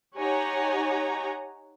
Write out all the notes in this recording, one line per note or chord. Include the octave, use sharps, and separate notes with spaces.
D#4 G4 C#5 F#5 G#5 A#5